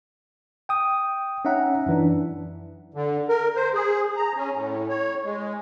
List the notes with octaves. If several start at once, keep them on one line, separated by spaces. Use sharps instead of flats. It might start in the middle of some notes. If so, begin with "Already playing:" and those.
G5 D#6
C#4 D#4 E5 F#5 A#5
F#2 E3 D4
D3
A#4
C5
G#4
A#5
C#4
A2
C#5
G#3